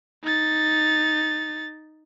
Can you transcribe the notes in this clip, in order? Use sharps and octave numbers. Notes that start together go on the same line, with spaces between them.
D#4 A6